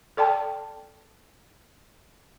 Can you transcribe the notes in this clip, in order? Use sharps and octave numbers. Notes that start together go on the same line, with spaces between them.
A4 D5 G5 A5